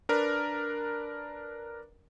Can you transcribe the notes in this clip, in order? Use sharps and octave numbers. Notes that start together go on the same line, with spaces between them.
D4 A#4 B4 D5